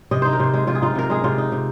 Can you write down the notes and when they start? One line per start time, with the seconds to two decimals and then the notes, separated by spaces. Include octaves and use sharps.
0.11 C3 D#5
0.22 D#4 C5
0.33 A#4
0.40 C3 C5
0.54 G#3
0.67 C3 F4
0.75 G#4
0.82 D#4 F4
0.95 C3 A#4
1.10 G#3 G#4
1.24 C3 F4
1.38 D#4
1.52 C3